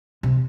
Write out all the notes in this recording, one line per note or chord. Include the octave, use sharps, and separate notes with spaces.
C3